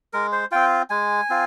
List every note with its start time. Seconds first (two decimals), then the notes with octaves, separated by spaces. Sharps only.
0.13 G#3 A#4
0.32 C5
0.51 C4 F4 G5
0.90 G#3 G#5
1.29 C4 F4